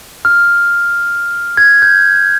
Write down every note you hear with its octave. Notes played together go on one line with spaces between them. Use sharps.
F6
G#6
G6